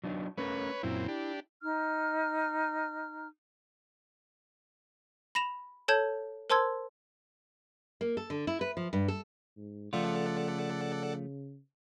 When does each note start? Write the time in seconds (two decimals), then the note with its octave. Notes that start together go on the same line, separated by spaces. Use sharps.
0.04 F#3 D4 D#4
0.38 A3 C#4 A#4 B4 C#5
0.83 F#2 A#2 C4 E4
1.08 D4 G4
1.62 D#4 F6
5.35 B5 A#6 E7 F7
5.88 A4 C#5 A5 G6 G#6 E7
6.50 A#4 C5 A5 C6 E6 G#6
8.01 A#3
8.17 A4
8.30 D3
8.47 E4
8.61 B4
8.77 F3
8.93 G2
9.08 A4
9.57 G#2
9.93 C#3 F3 A3 F4 A4 D5 F#5